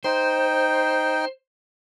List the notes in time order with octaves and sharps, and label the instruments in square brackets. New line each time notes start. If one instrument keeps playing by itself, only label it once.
[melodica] D#4 G5 [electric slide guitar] C5